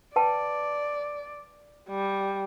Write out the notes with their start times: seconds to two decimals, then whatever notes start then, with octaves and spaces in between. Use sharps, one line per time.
0.16 B4 D5 G5 A5
1.90 G3